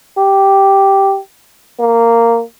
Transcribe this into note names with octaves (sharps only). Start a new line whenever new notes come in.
G4
A#3